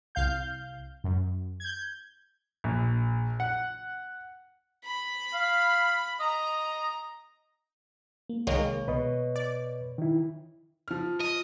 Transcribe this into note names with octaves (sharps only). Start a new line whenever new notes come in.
C2 F5 G6
F#2
G6 G#6
A#1
F#5
B5
F5
D#5 A#5
A#3
C2 D#3 G#3 A#3 C#5
B2 B4 D#5
D5
D#3 E4
F3 F6
D#5